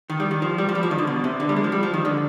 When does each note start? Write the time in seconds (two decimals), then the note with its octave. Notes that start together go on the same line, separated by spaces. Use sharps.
0.10 D#3
0.20 G3
0.31 D#3
0.42 F3
0.58 G3
0.69 F3
0.75 G3
0.83 F3
0.91 D#3
0.98 D3
1.07 B2
1.24 C3
1.40 D3
1.49 G3
1.56 G#3
1.64 F3
1.72 G3
1.83 F3
1.94 D#3
2.05 D3